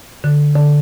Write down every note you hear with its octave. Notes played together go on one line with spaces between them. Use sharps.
D3
D3